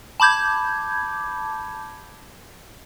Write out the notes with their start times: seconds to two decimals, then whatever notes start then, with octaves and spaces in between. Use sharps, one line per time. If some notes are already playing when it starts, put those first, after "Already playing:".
0.20 A5 B5 D6 G6 G#6